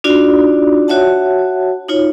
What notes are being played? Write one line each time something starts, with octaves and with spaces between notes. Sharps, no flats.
D4 D#4 F4 F#4 D5
F#4 C#5 E5 F#5 A5
D#4 F4 C#5